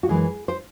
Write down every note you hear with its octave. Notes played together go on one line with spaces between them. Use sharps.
F#4
F#2 E3 G#3 G#4
C5